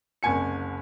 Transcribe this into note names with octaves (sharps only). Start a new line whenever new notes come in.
F#1 C2 G#5 C#7